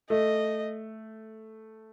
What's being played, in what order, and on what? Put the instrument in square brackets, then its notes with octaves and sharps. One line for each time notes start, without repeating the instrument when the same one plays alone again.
[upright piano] A3 [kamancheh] D#5